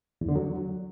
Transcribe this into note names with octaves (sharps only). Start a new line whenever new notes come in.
E2
D3
F#3